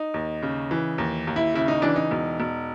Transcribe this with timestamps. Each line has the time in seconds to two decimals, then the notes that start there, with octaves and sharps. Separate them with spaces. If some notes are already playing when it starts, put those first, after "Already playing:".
Already playing: D#4
0.14 D#2
0.43 C#3
0.71 E3
0.98 D#2
1.27 D#2
1.36 E4
1.54 C#3 E4
1.68 D#4
1.82 E3 D4
1.96 D#4
2.11 E1
2.40 E1